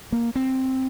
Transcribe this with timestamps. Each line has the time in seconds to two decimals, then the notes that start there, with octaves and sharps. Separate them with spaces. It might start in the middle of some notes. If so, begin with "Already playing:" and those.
0.12 A#3
0.35 C4